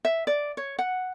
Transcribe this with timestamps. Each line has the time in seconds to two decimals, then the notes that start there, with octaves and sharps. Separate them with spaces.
0.05 E5
0.27 D5
0.57 C#5
0.79 F#5